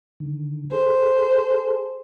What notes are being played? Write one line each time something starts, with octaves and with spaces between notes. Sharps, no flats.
D3 D#3
G#4 A4 C5